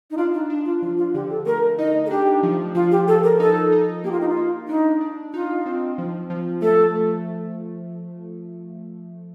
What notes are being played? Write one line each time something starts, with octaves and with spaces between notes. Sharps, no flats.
D#4
D4 F4
D#4
D4
F4
F3 F4
F4
D3 G4
A4
A3 A#4
D#4 D#5
A4
D4 G4
F3
F3 F4
G4
F3 A4
A#4
D#4 A4
D#4
A#3 G4
F4
D#4
F4
A#3
D4 D#4
D4
D#4 F4
C4
F3
F3
A3 A4
A3